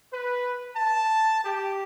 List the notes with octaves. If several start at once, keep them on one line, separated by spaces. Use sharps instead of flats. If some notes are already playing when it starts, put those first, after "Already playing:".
B4
A5
G4